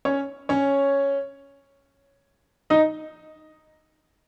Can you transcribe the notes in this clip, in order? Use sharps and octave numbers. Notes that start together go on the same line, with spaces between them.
C#4 C#5
C#4 C#5
D#4 D#5